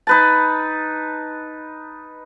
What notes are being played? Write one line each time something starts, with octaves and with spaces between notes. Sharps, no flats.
D#4 B4 A5